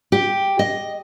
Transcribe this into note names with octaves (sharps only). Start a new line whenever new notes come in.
G4
D#5